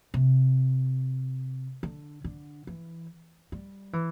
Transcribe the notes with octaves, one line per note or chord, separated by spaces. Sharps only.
C3
D3
D3
E3
G3
E3